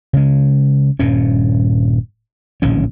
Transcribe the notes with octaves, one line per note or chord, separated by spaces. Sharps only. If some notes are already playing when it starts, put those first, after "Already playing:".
C#3 G#3
D#1 G2 A#2 C#4
D1 A#1 D#3 C#4